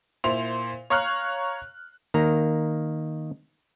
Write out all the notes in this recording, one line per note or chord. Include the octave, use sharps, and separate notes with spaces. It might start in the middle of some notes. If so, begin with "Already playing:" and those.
A#2 E4 C5 C6 F7
C#5 F5 A#5 C#6 F6 F#6
D#3 A#3 A#5